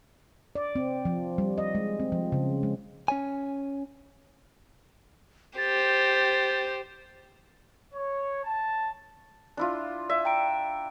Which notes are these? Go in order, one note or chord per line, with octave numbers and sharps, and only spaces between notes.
D5
C4
F3
G3
D#5
G#3
C4
F3
C#3
G#3
C#4 C#5 G#5
G4 C5 A6
C#5
A5
D4 E4 F4
D5 E5
G5 A#5 D7